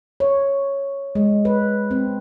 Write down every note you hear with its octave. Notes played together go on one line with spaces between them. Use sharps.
C#5
G#3
B4
C4